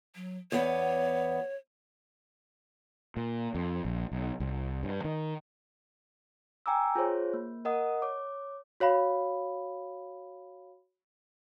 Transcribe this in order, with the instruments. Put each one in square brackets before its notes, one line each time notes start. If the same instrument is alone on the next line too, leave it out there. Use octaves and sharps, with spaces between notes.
[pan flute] F#3
[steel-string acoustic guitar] E2 B3 [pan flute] C#5
[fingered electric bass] A#2
F2
A#1
B1
C2
G2
D#3
[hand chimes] G5 G#5 A#5 D6 E6
F4 G#4 C5 C#5
A#3
A#4 D#5 F#5 D#6
C#5 D6
[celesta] F#4 C#5 F5 B5